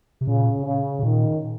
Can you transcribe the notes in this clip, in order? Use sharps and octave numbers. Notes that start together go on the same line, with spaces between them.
C3
A#2 C#3
C#3
C3
A#2 D#3